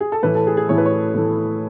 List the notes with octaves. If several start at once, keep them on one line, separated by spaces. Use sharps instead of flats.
G#4
A4
A2 E3 A3 E4 B4
A4
G#4
G#4
A2 E3 A3 E4 C#5
B4
C#5
A2 E3 A3 E4